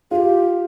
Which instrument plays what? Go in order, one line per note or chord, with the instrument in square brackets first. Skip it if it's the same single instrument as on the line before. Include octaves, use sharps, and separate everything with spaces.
[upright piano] F4 [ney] G4 G#4